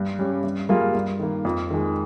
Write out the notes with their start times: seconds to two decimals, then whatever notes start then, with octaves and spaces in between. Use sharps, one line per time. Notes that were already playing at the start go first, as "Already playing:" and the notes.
Already playing: G2
0.19 G3 C#4 G4
0.43 G2
0.69 G3 A#3 F4 G#4
0.95 G2
1.19 D#3 A#3
1.45 F2
1.70 D#3 G#3